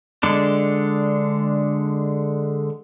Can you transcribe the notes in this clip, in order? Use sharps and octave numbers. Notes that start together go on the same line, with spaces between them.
D3 G#3 D4